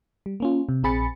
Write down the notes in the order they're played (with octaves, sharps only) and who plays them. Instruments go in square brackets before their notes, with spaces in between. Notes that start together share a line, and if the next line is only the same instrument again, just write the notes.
[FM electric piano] G3
A#3 C#4 F4
C3
A#1 C4 G#4 B5 A6 C#7